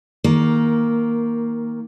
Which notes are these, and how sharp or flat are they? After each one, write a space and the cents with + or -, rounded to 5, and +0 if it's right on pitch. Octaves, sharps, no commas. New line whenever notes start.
D#3 +15 A#3 +0